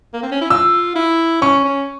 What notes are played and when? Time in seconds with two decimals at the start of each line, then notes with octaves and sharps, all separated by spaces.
0.14 A#3
0.23 C4
0.32 C#4
0.41 E4
0.50 F4 E6
0.95 E4
1.41 C#4 C#6
1.64 C#4